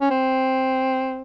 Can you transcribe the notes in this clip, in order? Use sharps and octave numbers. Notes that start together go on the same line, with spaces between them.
C#4
C4